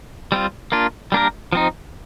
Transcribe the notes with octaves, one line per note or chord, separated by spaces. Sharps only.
G3 C4 F4
A#3 D4 F4
G3 A#3 D4 G4 A#4
F3 C4 D#4